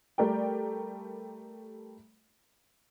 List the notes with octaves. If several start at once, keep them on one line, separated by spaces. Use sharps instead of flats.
G3 A3 A#4 D5 G5